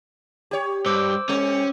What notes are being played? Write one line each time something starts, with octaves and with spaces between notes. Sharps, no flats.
G4 C#5
G2 C5 D6 E6
G3 C#4